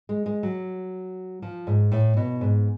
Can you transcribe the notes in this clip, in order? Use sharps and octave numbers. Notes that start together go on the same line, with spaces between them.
G#3
G#3
F#3
F3
G#2
A2
B2
G#2